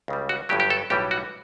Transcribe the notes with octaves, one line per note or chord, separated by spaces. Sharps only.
C#2 C#3 G3
F#4
G1 G2 F#3 G4
G4
A4
B1 A2 E3 G3 G4
F#4